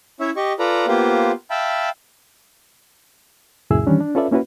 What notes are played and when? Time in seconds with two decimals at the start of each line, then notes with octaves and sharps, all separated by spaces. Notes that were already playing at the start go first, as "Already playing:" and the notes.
0.20 C#4 E4 C#5 E5
0.36 G4 D#5 C#6
0.59 F4 A4 B4 D5 A#5
0.88 A#3 B3 F4 G4 C5
1.50 E5 F5 G5 A5 B5
3.70 C#2 F#2 A#2 E4 G#4 E6
3.87 D#3 E3 G3 C#4 D4
4.01 D4
4.15 C#4 F4 A4 B4 D5 E5
4.31 A#3 C#4 E4 F#4 B4